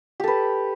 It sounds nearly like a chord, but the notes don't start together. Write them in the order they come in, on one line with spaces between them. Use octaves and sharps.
G4 A4 B4